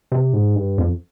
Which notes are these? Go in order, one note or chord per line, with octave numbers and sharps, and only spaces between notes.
C3
G#2
G2
F2